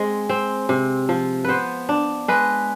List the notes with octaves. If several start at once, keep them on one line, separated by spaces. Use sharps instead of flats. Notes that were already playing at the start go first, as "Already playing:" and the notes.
Already playing: G#3 C4
C4
C3
F3
B3 B4 C5
D4
G#3 B4